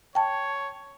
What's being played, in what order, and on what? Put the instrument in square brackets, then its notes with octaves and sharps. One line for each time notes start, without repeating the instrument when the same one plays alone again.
[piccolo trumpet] C#5 [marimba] G5 A5